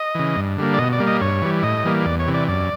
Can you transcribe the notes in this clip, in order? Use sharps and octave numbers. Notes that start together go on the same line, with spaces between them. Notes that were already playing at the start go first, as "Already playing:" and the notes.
Already playing: D#5
C#3 E3
G2
D3 G3 A#3
D5
B2 D#5
D5
G3 A#3
D#5
G2 C#5
E3 G3
A2 D#5
E3 G3 A#3
E2 D5
C#5
C3 E3
D5
F#2 D5